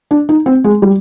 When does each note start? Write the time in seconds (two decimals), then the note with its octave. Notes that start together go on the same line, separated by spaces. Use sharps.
0.11 D4
0.29 D#4
0.46 C4
0.64 G#3
0.82 G3